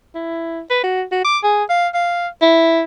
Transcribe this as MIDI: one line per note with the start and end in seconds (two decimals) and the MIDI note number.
0.15 0.61 64
0.70 0.82 71
0.83 1.03 66
1.12 1.20 66
1.24 1.38 86
1.43 1.64 68
1.69 1.88 77
1.94 2.28 77
2.42 2.82 64